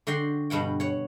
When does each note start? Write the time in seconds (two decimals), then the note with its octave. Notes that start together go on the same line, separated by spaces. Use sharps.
0.07 D3 F#4 F#5 G5 C6
0.50 G2 B2 F#5 G5
0.80 C#5 F#5